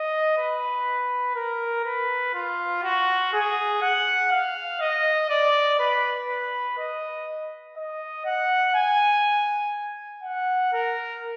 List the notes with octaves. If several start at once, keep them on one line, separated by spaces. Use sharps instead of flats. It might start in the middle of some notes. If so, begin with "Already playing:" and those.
Already playing: D#5
B4
A#4
B4
F4
F#4
G#4
F#5
F5
D#5
D5
B4
B4
D#5
D#5
F#5
G#5
F#5
A#4